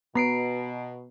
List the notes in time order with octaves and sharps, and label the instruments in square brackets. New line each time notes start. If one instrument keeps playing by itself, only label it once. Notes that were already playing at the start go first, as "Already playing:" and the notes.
[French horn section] B2 [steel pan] B3 [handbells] A#5 C7 D7